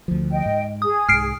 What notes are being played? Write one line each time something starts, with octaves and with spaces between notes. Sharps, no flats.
D2 F3
D#5 G5
G#2
G#4 D#6
C2 G#2 F6 C7 D7